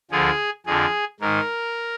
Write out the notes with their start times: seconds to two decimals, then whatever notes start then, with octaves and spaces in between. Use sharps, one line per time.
0.10 D2 D3 F3 G#4
0.66 F2 D3 F3 G#4
1.20 G#2 D#3 A#4